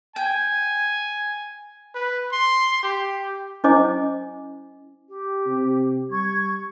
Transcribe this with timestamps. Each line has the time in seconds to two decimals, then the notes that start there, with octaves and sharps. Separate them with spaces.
0.16 G5 G#5
1.95 B4
2.32 C6
2.83 G4
3.64 C#4 E4 C5 D#5 G#5 D6
5.08 G4
5.46 C3
6.11 G3 C#6 G#6